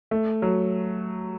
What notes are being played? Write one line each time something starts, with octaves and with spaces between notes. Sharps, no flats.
A3
F#3